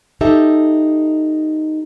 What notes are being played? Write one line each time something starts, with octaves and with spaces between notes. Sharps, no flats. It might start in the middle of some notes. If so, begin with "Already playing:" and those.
D#4 G4 A4 E5